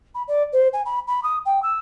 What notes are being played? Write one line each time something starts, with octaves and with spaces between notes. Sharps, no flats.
B5
D5
C5
G#5
B5
B5
D#6
G5
E6